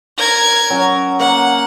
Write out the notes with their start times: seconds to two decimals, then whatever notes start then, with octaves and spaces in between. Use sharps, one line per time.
0.17 A#4 G#6
0.70 F#3 C#4
1.20 A#3 F#5